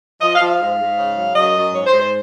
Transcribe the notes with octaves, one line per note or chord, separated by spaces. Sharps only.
F3 D#5
F5
F3
F5
G#2
G#2
C#3
F#3
F#2 D#5
F#2
G#2 C#5
C5
G#2
C5